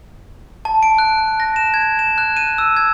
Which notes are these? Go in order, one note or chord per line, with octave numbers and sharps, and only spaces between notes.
A5
D7
F#6
A#6
E7
G#6
E7
F#6
D#7
E6
G#6